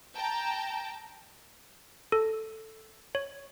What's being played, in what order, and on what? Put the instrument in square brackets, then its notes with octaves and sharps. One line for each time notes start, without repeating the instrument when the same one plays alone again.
[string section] G5 A5 A#5
[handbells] A4
C#5